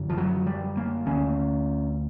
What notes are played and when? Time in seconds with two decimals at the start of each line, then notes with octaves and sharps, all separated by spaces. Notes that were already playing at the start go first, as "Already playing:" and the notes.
Already playing: F#2 D3
0.10 F3
0.18 F#3
0.47 G3
0.77 A#3
1.06 D2 D3 C#4